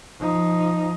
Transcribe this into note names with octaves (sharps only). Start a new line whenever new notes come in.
F3 D#4